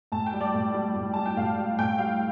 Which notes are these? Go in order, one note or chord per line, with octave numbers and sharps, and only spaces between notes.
A2 A5
G5
G3
D5
A2
G3
A2
G3 A5
G5
A2 F5
G3
A2 G5
G3 F5